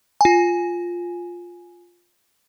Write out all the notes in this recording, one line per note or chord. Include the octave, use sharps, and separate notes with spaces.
F4 G#5